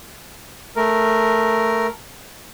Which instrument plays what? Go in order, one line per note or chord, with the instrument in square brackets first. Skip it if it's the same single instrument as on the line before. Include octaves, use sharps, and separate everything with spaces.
[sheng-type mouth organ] A3 A#4